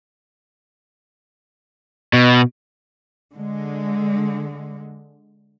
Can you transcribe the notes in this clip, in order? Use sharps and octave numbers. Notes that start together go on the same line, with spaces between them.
B2
D3 G#3